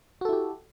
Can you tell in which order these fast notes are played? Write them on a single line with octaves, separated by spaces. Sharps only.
F#4 A4 E4 G4